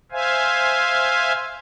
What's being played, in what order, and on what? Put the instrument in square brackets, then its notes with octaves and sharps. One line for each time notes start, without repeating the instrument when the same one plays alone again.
[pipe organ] C5 E5 F5 G#5